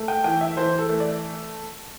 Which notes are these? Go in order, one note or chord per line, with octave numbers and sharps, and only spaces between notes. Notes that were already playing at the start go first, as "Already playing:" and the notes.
Already playing: A3
G5
E3 G5
E5
E3 C5
A4
A3
D5